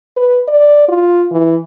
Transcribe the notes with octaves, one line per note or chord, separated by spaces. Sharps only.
B4
D5
F4
E3